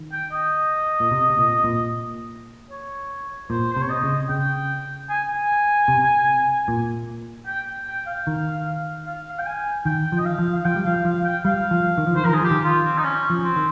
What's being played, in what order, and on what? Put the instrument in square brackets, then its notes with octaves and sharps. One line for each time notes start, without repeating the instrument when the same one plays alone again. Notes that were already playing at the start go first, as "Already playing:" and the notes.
Already playing: [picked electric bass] D#3
[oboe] G5
D#5
[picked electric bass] A#2
C3
C3
A#2
A#2
[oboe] C#5
[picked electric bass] A#2 [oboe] C5
[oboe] C5
[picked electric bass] C3 [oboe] C#5
[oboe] D#5
[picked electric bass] C#3
[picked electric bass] C#3 [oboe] G5
[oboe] G#5
G#5
[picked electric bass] C3
A#2
[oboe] G5
G5
F5
[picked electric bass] D#3
[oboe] F5
F5
G5
G#5
[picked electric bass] D#3 [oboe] G5
[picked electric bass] F3
[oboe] D#5
F5
[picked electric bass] F3
[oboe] F5
[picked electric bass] F3 [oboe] G5
[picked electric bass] G3
[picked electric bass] F3 [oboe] F5
[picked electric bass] F3 [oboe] F5
[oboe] G5
[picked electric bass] G3 [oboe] F5
[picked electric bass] F3
D#3
F3
[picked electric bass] D#3 [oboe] C5
[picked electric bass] F3 [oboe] A#4
[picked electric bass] D#3 [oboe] G#4
[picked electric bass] F3 [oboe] G4
[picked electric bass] D#3
[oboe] F4
C4
D#4
C#4
[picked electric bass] F3
[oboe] C4
[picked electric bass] D#3